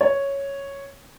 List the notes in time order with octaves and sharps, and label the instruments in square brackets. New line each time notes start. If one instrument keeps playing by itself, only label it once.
[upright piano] C#5